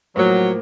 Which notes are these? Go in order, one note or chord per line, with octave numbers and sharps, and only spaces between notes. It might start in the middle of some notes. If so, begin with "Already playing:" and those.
A2 F3 F#3 A#3